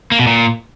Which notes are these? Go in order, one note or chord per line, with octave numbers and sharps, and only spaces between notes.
A#3
B2
A#2